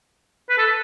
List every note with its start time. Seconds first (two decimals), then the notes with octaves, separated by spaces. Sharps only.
0.50 B4
0.58 A4